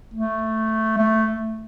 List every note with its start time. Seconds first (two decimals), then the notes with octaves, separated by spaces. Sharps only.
0.14 A3
0.98 A3